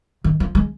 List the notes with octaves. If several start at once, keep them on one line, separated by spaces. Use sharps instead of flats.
D#3
F3
G#3